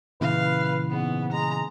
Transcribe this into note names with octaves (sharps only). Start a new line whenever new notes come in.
A#2 C#3 E3 B4 F5
G#2 B3
G#3 A#5